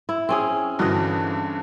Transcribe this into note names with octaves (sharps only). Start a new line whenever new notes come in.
E4
C4 C#4 G#4
G2 D3 E3 F#4 D#5